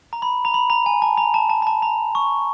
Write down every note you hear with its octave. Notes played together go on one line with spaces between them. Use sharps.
A#5
B5
A#5
B5
A#5
G#5
A5
A#5
A5
A5
A#5
A5
A#5
C#6